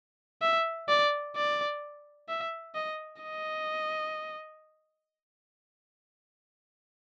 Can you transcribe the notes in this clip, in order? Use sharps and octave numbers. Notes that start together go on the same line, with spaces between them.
E5
D5
D5
E5
D#5
D#5